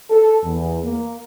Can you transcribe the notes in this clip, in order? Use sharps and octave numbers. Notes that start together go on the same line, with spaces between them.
A4
E2
A#3